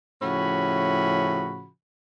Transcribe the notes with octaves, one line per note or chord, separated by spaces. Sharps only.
A2 C#3 F3 C#4 F#4 B5